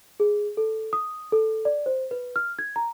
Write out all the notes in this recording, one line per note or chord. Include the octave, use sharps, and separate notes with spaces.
G#4
A4
D#6
A4
D5
C5
B4
F6
G#6
A#5